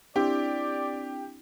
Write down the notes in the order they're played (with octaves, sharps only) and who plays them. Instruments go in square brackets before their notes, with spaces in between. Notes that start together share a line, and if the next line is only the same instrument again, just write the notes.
[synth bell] C4 D4 E4 [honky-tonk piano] G4 [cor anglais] D5